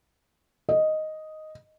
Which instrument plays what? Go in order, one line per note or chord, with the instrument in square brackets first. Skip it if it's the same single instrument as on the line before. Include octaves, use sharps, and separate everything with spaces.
[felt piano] D#5